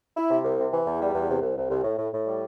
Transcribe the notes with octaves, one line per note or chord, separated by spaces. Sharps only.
E4
C3
C2
C3
E3
E2
G3
E2
C3
C2
C2
C2
A2
A2
A2
G3